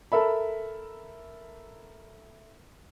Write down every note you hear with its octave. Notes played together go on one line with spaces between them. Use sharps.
A4 A#4 E5 B5